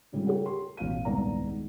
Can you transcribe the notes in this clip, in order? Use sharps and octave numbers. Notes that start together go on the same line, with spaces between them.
G#2 C#3 G3 A3 C4 F4
G4 A#4 C#5 F#5
C6
A1 B2 F5 D#7
D#1 C2 G#2 B3 D5 A#5
D#3 G#3